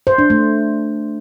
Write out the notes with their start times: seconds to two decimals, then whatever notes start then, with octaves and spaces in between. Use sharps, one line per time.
0.07 C5
0.18 D4
0.30 A3